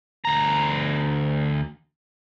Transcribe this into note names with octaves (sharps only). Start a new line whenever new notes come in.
D2 A#5